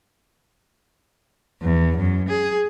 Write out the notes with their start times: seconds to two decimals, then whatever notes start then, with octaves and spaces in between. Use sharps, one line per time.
1.62 E2
1.98 F#2
2.28 G#4